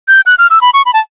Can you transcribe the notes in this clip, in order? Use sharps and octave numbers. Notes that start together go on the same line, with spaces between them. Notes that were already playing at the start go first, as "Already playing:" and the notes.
G6
F#6
F6
E6
B5
C#6
B5
A5